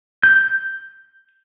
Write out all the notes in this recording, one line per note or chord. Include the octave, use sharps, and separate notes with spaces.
G6